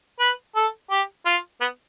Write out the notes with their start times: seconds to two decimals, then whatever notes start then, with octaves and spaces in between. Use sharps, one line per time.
0.20 B4
0.55 A4
0.90 G4
1.25 F4
1.61 B3